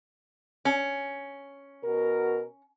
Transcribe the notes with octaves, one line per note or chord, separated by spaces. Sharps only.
C#4
B2 F#4 A#4